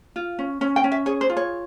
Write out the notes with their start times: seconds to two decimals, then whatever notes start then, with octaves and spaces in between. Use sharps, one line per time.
0.16 F4
0.39 C#4
0.61 C#4
0.76 G5
0.84 C#4
0.92 E5
1.06 G#4 C#5
1.21 C5
1.30 F4
1.37 C#5